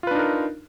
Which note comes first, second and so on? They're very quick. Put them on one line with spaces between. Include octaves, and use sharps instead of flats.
F4 B4 D4 D#4 A#4